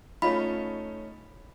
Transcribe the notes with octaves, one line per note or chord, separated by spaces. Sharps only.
A3 C#4 D#4 F4 B5